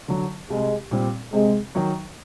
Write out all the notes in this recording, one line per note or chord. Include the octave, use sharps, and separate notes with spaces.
D3 F#3
C2 G#3
A#2 G3 C4
C3 G#3
D#3 F#3